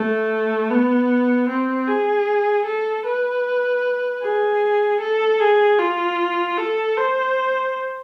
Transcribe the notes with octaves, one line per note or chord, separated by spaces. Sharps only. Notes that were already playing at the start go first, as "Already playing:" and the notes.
Already playing: A3
B3
C4
G#4
A4
B4
G#4
A4
G#4
F4
A4
C5